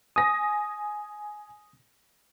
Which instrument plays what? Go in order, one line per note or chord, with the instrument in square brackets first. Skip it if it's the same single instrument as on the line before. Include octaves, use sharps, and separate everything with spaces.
[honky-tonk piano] G#5 A#6 [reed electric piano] D#6